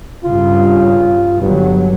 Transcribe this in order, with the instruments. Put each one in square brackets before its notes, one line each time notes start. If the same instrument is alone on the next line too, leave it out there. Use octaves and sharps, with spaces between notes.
[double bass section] G2 C#3 [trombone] F4
[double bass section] G1 F#3 [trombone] G2